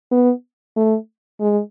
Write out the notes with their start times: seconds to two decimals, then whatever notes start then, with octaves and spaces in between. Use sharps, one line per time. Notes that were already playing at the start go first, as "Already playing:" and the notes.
0.11 B3
0.77 A3
1.40 G#3